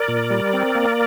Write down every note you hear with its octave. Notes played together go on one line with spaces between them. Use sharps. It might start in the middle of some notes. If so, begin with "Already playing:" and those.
Already playing: A#4 D5
A#2
G3
C4
A#3